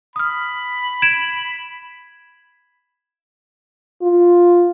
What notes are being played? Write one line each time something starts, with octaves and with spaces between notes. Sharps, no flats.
B5 D#6 F6
G#6 D7 E7
F4